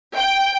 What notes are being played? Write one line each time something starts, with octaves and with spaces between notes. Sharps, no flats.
G5